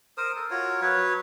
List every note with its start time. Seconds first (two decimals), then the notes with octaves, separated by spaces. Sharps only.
0.17 A#4 C5 D#6
0.36 A4
0.50 F4 F#4 A#4 C#5
0.82 F#3 B4 C#5